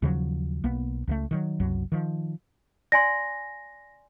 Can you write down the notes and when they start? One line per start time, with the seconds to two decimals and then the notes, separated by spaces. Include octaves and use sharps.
0.02 D#2 C#3 F3 F#3
0.64 B1 A#3 B3
1.08 C#2 F3 A3
1.31 D#3 E3 F#3
1.60 F#1 C2 F#2 F#3
1.92 D#3 F3
2.92 D5 G#5 C6 A#6